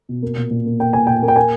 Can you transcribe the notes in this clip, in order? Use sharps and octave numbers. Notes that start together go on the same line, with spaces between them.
B2
A#3
A#2
A#2
A#3
A#3 G5
A#2 G#5
A#2 G5
A#3
G5
A#3 G#5